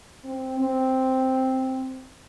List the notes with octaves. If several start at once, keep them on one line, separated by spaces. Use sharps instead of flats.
C4
C4